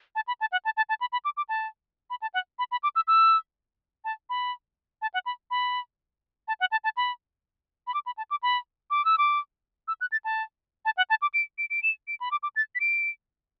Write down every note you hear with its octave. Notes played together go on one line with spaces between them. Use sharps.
A5
B5
A5
F#5
A5
A5
A5
B5
B5
D6
D6
A5
B5
A5
F#5
B5
B5
D6
E6
E6
A5
B5
A5
F#5
B5
B5
A5
F#5
A5
A5
B5
B5
D6
B5
A5
D6
B5
D6
E6
D6
E6
F#6
A6
A5
A5
F#5
A5
D6
D7
D7
D7
E7
D7
B5
D6
D6
A6
B6
D7